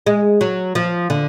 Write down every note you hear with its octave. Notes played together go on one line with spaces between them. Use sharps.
G#3
F#3
F3
D3